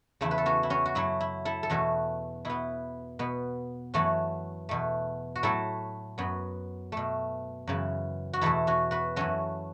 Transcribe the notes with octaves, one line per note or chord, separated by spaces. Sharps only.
E2 C#3 A3 E4
B4
A4
C#4 F#4
E4
C#4 F#4
F#4
F#2 F#3 A3 E4
E4
E4 A4
A4
E2 B2 A3 C#4 F#4
B2 B3 E4
B2 B3
F#2 E3 A3 C#4 F#4
E2 B2 A3
F#4
A2 F#3 A3 E4 A4
F#2 F#3 B3
B2 A3
F#2 C#3 E3
F#4
E2 B2 A3 E4 A4
C#4 F#4
F#4 B4
F#2 E3 A3 C#4 F#4